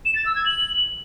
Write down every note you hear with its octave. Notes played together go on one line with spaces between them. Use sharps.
E7
A6
E6
G#6
F#7